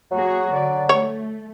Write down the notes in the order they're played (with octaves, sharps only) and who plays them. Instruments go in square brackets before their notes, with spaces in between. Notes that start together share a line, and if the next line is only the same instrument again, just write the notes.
[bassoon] F#3 [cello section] A#3 F#4 G#4
[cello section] D3 D5
[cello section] A3 [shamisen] C#5